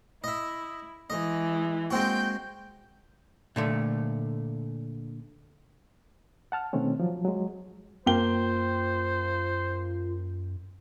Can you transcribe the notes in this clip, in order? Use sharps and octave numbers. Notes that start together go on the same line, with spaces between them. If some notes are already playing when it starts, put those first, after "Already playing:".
E4 D#5 E5
E3 G#3 D#5
G#3 A#3 C4 F#4 G5 G6
A#2 D3 A3
F#5 A5 F6
B2 D#3 A3 C4 C#4
F3 F#3
F#3 G#3
F#2 A#3 F4 C5 G5 G7